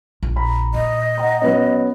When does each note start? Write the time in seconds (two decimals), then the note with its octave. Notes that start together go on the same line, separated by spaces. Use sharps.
0.23 A#1
0.36 A#5 B5
0.74 A#2 D#5
1.18 F#5 G5 A#5
1.42 F#3 B3 C#4